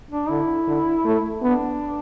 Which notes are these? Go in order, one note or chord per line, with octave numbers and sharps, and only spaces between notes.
D4
D3 E4
D3
A3
B3 D4